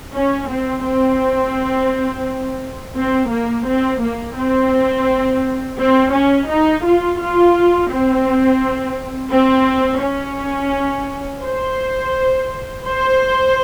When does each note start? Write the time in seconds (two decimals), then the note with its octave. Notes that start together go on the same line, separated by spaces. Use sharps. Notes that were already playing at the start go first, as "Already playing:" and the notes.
0.14 C#4
0.49 C4
0.84 C4
2.97 C4
3.31 A#3
3.67 C4
4.02 A#3
4.37 C4
5.78 C4
6.13 C#4
6.49 D#4
6.84 F4
7.20 F4
7.90 C4
9.30 C4
10.01 C#4
11.42 C5
12.84 C5